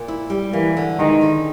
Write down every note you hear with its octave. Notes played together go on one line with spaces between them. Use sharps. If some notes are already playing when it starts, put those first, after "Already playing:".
Already playing: A#2
E4
G3
E3 A#3
D3
D#3 G#3
D3